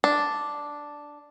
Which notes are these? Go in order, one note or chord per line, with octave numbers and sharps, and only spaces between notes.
D4